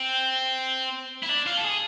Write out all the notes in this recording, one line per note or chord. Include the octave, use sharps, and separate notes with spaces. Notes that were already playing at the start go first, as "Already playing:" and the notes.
Already playing: C4
E4
D4
F4
A4
G#4